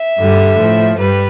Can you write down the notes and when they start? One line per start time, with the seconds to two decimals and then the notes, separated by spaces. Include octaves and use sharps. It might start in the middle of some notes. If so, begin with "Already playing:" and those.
Already playing: E5
0.17 G2 D3 G3
0.59 A2 F3
0.98 G2 G3 B4